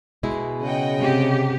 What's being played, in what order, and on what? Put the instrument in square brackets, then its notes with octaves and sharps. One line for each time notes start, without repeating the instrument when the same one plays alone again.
[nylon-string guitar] B2 G#3 E4
[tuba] C#3 [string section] D#5 F#5 G5
[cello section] C3 G4